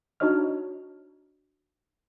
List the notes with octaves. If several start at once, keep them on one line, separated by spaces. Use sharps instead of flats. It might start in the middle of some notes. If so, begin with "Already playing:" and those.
D4 D#4 F#4 C#5 D#5 F6